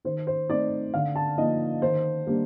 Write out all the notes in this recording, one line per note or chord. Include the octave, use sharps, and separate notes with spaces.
D#3 C5
C5
A3 C4 D#4 D5
D3 F5
A5
F3 A#3 D#4 D#5
D#3 C5
G3 A#3 D4